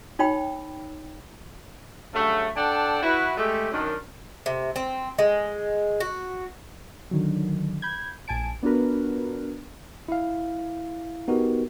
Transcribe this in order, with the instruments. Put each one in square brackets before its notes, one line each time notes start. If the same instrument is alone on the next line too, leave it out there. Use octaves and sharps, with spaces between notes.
[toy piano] D#4 C#5 G5 B5
[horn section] G2 C#3 F#3 A3
D4 A4 D5 F#5 G5 A5
E4 F#4 B4
G#3 A3 G4
F#2 D#3 D4
[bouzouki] C3
C4
G#3
F#4
[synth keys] D3 D#3 F#3
B5 G6 G#6
A#1 G#5 A5 D7
B3 D4 F4 F#4 A#4 B4
[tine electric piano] E4 F5
B3 D#4 F#4 G4 A#4